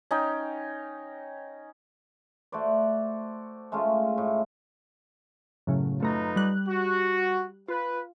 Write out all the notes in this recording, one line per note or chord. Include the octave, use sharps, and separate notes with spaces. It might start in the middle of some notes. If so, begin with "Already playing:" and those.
C#4 D#4 G5
A3 F#4 C5 D5
G#3 A3 C#4 F4
A2
F#2 A2 C#3
F#2 A3 D#4 F4 B4 A#5
G3 F#6
F#4
F4 B4